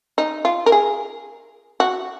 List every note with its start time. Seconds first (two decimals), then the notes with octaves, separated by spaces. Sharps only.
0.18 D#4
0.45 F4
0.66 A#4
0.72 G#4
1.80 F#4